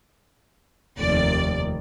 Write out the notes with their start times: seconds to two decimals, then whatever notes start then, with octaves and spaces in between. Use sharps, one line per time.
0.99 F1 D#2 D#3 D5